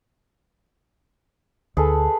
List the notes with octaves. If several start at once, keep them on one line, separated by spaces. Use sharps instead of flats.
D2 G#4 A4 B4